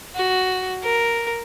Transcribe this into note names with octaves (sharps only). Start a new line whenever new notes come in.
F#4
A#4